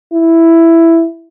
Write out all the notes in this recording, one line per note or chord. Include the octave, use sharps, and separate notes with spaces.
E4